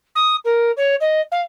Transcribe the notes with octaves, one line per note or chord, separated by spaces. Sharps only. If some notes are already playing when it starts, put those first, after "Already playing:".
D#6
A#4
C#5
D#5
F5